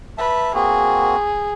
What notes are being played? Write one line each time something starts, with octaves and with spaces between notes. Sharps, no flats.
B4 E5 A5
A#3 C4 F#4 G#4